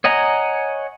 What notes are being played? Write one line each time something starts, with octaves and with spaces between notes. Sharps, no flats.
C#5 D#5 F#5 G#5 A#5